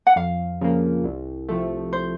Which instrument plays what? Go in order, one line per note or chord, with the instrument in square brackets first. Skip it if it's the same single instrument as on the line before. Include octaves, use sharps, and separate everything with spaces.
[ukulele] F#5
[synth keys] F2 [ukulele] F5
[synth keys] C#3 F3 A#3
C2
C3 F3 A3
[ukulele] C5